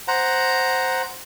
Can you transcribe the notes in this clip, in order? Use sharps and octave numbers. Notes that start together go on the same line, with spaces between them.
C5 F#5 A#5